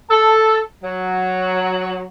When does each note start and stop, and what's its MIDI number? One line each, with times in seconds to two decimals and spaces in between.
0.10 0.59 69
0.83 2.04 54